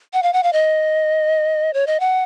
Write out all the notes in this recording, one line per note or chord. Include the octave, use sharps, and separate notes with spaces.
F#5
F5
F#5
F5
D#5
C#5
D#5
F#5